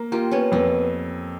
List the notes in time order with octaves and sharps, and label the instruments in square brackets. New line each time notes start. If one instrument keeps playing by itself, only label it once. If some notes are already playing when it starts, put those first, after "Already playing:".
Already playing: [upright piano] A#3
[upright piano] A#3 [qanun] F4 G4
[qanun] B3 C#4
[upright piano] F2 [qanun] B3